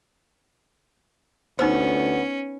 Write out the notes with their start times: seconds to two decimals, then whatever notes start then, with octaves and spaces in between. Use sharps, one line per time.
1.59 D2 B3 C#4 D#4 B4 C5